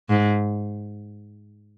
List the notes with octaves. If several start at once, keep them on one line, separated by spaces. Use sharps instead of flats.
G#2